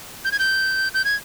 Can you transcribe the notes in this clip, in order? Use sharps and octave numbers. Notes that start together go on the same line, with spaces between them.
G6
G#6
G6
G6
G#6